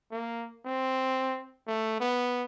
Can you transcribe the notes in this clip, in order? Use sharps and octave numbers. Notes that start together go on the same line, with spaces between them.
A#3
C4
A3
B3